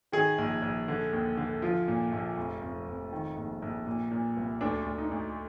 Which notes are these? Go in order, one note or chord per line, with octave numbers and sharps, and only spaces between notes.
D#3 G#4
A#1
A#1
D3
D#2
D3
F3 F4
A#2
A#1
F1
F1
F1
D#3
A#1
A#1
A#2
A#2
C2
D2 D4
D2
D#4
D2